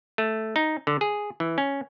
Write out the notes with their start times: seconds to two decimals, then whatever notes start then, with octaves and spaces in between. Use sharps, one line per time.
0.18 A3
0.56 D#4
0.87 D3
1.01 G#4
1.40 E3
1.58 C#4